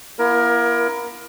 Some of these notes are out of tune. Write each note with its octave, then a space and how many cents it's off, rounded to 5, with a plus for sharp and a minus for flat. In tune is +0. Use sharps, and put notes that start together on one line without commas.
A#3 +45 E4 +25 A#4 +20